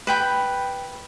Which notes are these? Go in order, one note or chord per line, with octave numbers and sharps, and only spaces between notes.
B4 G5 B5